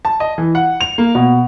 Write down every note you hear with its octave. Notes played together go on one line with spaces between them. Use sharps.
A5
D#5
E3
F#5
F7
A#3
B2